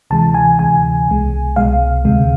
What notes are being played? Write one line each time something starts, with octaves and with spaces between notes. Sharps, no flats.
D2 C3 E3 G#3 A5
G#5
D2 C3 E3 G#3 G#5
C2 B2 G#3
C2 B2 G#3 F5
D2 C3 G#3